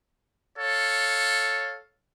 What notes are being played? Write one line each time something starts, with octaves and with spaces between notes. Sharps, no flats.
A4 C#5 F5